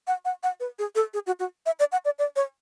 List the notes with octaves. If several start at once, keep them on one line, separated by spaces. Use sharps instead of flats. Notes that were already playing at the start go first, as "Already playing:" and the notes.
F#5
F#5
F#5
B4
G#4
A4
G#4
F#4
F#4
E5
D5
F#5
D5
D5
C#5